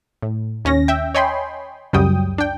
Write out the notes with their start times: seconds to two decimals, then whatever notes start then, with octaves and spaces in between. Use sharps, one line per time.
0.22 A2
0.65 D#2 C#4 A#6
0.88 E5 G5
1.15 C#5 D#5 G5 G#5 B5 C6
1.93 C#2 F#2 F#3 G3 G5 D#6
2.38 D4 G5